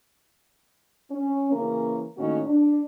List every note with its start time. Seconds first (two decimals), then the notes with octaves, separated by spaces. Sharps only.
1.11 C#4
1.52 C#3 E3 A#3 C#4 A#4
2.17 A2 D#3 A#3 C#4 D#4 F#4
2.46 D4